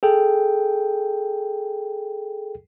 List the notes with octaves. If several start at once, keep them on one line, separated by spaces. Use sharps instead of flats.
G#4 A4 G5